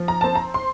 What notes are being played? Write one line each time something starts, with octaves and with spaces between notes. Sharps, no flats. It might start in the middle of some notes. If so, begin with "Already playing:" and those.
Already playing: F3
A#5
C4 A5
A#5
C6